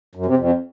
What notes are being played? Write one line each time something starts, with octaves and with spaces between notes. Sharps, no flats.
F#2
C3
F2